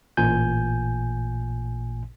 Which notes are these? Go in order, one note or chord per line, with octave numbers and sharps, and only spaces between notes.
A1 A#2 G#5 G6